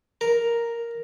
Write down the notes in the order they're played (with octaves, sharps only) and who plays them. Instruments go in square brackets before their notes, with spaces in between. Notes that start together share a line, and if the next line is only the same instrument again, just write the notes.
[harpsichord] A#4